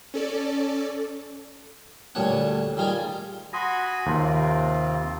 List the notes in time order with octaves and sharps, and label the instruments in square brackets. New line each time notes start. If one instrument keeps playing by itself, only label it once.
[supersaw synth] C#4 A4 D5
[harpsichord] D2 A#2 G3 D4 C#5 F#5
D#3 G3 F4 G#4 D5
[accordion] F#4 G#5 B5 [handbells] C6 D#6 A#6
[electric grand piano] D#2 [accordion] C3 C4 F4